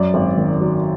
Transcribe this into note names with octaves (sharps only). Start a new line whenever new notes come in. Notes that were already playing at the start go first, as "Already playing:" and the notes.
Already playing: F#2 D5
G#1
D#3
F#3